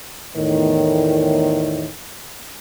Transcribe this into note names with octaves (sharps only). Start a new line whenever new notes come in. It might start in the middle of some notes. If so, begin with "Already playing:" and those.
E2 A2 D#3